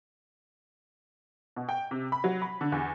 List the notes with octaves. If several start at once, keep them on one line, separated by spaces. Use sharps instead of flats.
B2
G5
C3
B5
F#3
B5
D3
E2